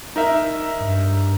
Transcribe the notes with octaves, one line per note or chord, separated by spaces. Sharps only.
D#4 A#4 E5
G2